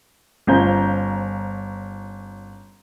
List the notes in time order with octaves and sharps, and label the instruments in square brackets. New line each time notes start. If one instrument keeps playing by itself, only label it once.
[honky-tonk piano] G1 C#4 C5 F5 A#5 G6